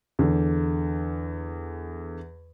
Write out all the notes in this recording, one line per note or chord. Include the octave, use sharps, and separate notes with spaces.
E2 D3